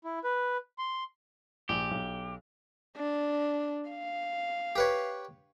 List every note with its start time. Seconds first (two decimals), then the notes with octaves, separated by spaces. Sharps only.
0.04 E4
0.24 B4
0.78 C6
1.69 A#1 G4 F7
1.91 B1
2.97 D4
3.90 F5
4.76 G4 B4 C#5